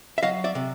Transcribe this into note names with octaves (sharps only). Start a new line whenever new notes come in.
E5
F#3 D#5 F5
D5 E5
C3